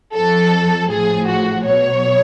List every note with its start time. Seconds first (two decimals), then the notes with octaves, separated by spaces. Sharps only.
0.14 F2 F3 A4
0.90 A1 A2 F3 G#4
1.28 F#4
1.66 B1 B2 F#3 C#5